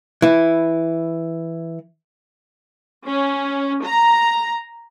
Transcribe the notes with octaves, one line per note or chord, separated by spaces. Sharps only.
E3 E4
C#4
A#5